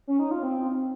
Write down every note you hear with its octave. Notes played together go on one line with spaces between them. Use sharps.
C#4
D#4
F4
C4